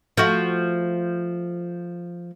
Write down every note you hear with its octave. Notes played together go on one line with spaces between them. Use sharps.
F3 A3 F#4